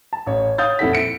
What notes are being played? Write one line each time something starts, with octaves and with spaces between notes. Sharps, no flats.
A5
A1 C#5
C#5 F5 D#6 G6 A6
D#1 F2 E4 A4 F#5 B6
C#7 D7